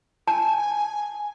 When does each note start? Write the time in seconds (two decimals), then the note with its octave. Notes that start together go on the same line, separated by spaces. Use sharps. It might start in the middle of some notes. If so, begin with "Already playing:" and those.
0.28 G#5 A5